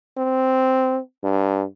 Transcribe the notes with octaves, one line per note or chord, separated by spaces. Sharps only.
C4
G2